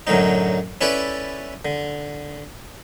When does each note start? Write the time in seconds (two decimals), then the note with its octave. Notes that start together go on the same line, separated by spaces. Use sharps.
0.07 F#2 A2 D3 F#3 D#4
0.81 C#4 E4 A4 B4 D5
1.65 D3